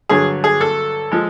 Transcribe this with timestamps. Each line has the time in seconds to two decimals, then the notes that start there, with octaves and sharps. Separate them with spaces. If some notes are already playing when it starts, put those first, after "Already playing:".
0.09 G2 D3 F#3 G#4
0.44 G#4
0.61 A4
1.12 F3 G#3